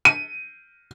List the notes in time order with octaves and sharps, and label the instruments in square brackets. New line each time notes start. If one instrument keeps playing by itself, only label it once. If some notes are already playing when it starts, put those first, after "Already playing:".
[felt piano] D#7